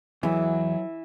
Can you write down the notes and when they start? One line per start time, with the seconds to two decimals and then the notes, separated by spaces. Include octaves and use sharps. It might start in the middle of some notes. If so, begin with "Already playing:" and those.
0.23 E2 E3 F#3 E5